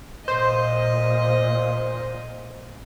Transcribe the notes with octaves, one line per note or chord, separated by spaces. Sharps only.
A#2 C5 D#5